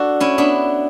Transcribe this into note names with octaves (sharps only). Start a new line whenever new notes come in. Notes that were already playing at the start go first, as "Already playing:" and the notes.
Already playing: D4 F#4 A4
C#4 E4
B3 D4